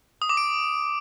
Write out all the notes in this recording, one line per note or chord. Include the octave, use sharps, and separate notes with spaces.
D#6
D6
D7